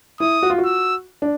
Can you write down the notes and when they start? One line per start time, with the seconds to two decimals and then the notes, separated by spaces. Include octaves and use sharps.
0.20 E4 D#6
0.43 F#4
0.50 F4
0.58 F#4
0.65 E6
1.22 D4